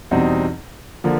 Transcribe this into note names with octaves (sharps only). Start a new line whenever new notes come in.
E2 B2 G3 C4 D#4
D3 F3 A#3